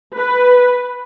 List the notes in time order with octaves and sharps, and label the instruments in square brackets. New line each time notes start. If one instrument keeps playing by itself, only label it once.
[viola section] B4